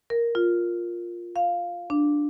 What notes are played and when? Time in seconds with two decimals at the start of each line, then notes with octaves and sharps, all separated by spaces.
0.10 A#4
0.35 F4
1.36 F5
1.90 D4